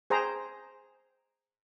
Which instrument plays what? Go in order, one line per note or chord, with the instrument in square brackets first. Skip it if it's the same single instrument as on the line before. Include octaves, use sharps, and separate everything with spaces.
[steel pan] G#4 C5 G5 A#5